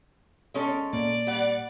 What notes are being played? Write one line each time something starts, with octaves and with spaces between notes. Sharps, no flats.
G#3 C#4 A4
A#2 A#3 D5
G3 F#5